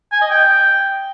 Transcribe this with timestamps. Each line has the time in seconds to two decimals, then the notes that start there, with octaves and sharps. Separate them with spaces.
0.12 G#5
0.21 D#5
0.30 G5